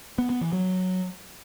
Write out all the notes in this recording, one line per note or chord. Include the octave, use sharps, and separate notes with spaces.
B3
B3
E3
F#3